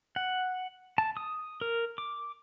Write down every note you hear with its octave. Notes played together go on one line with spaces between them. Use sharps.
F#5
A5
D#6
A#4
D6